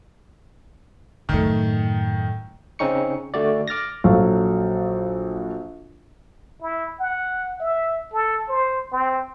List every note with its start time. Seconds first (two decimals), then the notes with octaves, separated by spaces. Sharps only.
1.29 F#2 A2 D#3 A3
2.79 C#3 C4 C#4 D#4 C#6 C#7
3.34 D3 A3 F#4 D5
3.68 D6 F6 A6 A#6
4.04 A#1 F#3 A4 F5 C#6
6.62 E4
7.00 F#5
7.60 E5
8.13 A4
8.49 C5
8.92 C4